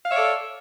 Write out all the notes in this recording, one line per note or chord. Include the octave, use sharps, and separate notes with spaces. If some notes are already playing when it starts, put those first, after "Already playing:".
A4 C#5 D5 E5 F5